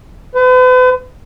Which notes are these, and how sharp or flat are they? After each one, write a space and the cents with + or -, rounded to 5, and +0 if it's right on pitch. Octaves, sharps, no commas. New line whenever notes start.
B4 +40